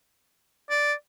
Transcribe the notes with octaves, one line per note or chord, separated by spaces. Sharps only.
D5